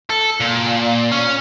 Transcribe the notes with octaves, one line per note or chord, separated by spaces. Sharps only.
A4
A#2
C#4